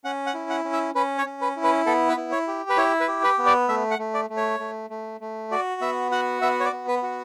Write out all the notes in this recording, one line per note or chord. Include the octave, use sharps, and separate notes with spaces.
C#4 F#5
F#5
E4
F#5
C#4
E5
C#4 B4
C#5
C#4
B4
E4
B4
B3 A4
B4
E4
C#5
G4
B4
E4 C#5
B4
G4
B4
B3
D5
A3 E5
F#5
A3
D5
A3
C#5
A3
A3
A3
F#4 D5
B3 E5
F#4 F#5
B3 E5
C#5
D5
B3
B4
F#4